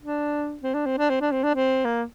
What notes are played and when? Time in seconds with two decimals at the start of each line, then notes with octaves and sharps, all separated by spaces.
0.02 D4
0.63 C4
0.74 D4
0.86 C4
0.98 D4
1.10 C4
1.21 D4
1.32 C4
1.43 D4
1.55 C4
1.85 A#3